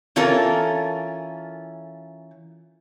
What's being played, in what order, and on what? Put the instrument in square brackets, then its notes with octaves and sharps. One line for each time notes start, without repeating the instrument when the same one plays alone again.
[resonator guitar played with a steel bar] E3 C#4 F4 A4 A#4